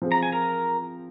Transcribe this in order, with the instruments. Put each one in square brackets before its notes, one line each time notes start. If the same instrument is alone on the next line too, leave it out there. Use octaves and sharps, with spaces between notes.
[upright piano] F3 C4 F4 G#4
[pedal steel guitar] A#5
G#5
A#4 A#5